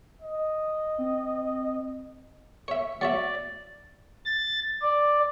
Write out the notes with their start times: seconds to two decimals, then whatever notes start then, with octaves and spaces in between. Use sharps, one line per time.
0.22 D#5
0.98 C4
2.68 C#5 E5
3.01 F#3 C#5 D5 E5
4.26 A6
4.82 D5